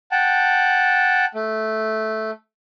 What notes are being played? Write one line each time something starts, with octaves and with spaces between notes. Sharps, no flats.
F#5 G5 A5
A3